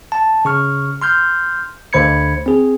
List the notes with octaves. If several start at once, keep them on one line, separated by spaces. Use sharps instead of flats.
A5
C#3 C#6 F6
C6 F6 G6
D2 D3 C5 B5 G#6 C#7
C4 G#4